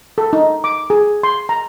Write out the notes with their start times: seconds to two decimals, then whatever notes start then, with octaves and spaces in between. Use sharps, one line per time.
0.18 A4
0.33 D#4
0.64 D6
0.90 G#4
1.23 C6
1.49 A#5